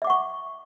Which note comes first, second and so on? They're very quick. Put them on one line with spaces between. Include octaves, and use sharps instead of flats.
E5 D6 F#5 C#6